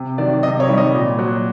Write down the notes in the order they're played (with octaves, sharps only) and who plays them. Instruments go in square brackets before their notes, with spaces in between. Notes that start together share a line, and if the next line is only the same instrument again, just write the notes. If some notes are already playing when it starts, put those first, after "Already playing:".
Already playing: [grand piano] C3
D#3 F#3 D5
C3 D#5
C#5
D#3 G3
D#5
A#2
F#3